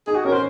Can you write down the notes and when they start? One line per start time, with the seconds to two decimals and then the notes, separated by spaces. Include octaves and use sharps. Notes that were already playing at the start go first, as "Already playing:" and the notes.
0.07 D#4 G#4
0.16 F#4
0.24 C#4 A#4
0.33 C5